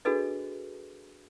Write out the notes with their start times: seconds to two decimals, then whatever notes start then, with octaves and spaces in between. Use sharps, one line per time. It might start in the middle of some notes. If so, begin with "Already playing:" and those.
0.05 D4 F#4 G#4 A4 B4 D#5